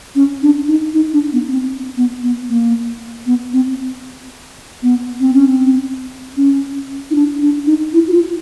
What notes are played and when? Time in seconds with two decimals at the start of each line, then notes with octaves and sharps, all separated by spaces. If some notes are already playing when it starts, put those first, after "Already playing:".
0.15 C#4
0.42 D4
0.68 D#4
0.94 D#4
1.13 D4
1.33 B3
1.48 C#4
1.52 C4
1.97 B3
2.23 B3
2.49 A#3
3.26 B3
3.53 C4
4.82 B3
5.20 C4
5.34 C#4
5.47 C4
6.37 C#4
7.11 D#4
7.15 D4
7.41 D4
7.66 D#4
7.93 E4
8.08 F#4
8.13 F4